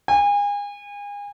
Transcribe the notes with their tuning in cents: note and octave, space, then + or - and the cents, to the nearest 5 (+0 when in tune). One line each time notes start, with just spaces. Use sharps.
G#5 -35